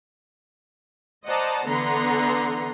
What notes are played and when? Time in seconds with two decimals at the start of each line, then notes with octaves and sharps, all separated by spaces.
1.25 C5 D5 D#5 F#5 A5 A#5
1.67 D3 E3 B3 F#5 A#5 C6